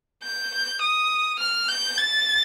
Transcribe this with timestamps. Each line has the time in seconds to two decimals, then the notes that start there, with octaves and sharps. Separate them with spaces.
0.23 G6
0.81 D#6
1.39 F6
1.69 G6
1.98 A6